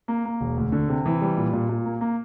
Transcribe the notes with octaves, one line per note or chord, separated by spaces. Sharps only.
A#3
A#3
E1
D2
D3
C3
E3
G3
A#2
A#2
A#2
A#3
A#3